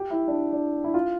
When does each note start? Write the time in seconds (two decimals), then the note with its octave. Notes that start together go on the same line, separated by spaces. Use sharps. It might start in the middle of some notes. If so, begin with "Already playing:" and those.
Already playing: G4
0.10 E4
0.28 D4
0.52 D4
0.84 E4
0.94 F4